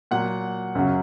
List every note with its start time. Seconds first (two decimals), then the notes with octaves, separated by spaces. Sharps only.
0.11 A#2 F#3 F#5
0.75 F#2 C#3 F#3